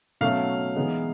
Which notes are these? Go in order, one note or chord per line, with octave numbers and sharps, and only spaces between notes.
B2 F#3 A3 C#4 F5
E3 G#3 B3 D#4